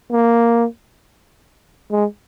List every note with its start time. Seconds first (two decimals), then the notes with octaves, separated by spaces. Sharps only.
0.11 A#3
1.91 G#3